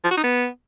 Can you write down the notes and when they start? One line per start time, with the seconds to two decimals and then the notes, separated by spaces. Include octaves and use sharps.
0.04 F3
0.11 F#4
0.17 D#4
0.24 B3